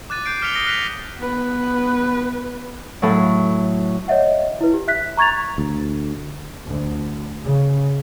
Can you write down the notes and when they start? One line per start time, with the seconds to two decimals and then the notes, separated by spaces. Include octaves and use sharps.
0.10 D6 F#6 A6 D#7
0.26 G6 C7 D7
0.42 D6 F6 B6 C#7 F7 G7
0.54 D#6 A#6 C7 G7
0.66 F6 F#6 B6 D#7 F7
1.17 B3 B4
3.02 A2 F#3
4.08 C#5 D#5 E5 F#5
4.61 E4 B4
4.74 G4
4.88 E5 F#6 B6
5.17 A#5 C#6 G#6 A6 F7
5.58 D2
6.65 D2
7.45 C#3